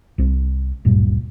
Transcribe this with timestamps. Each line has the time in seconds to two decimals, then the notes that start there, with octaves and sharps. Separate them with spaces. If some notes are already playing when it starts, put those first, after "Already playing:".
0.18 C2 C4
0.85 D1 G1 G2 A#2